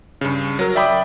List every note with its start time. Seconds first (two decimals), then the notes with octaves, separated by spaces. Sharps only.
0.21 G2 C#3
0.59 F#3 A#4
0.75 D5 E5 G5 B5 D6 D#6